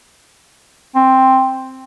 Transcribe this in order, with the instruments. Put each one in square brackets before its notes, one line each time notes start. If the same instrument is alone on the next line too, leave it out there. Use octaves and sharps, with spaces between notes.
[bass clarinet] C4